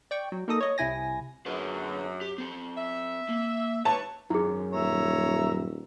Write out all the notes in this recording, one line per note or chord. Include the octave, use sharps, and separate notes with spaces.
D5 G5 C#6
F#3
A#3 D#4 A4 D#6 A#6
C#5 D#5
C2 C3 E4 G#5 A#6
F#2 D3 G#4 B4
G4
C4 A4
E5
A#3
C#4 G4 B4 C#5 A5
G#1 F#2 E4 G#4
D#1 C#5 E5 A#5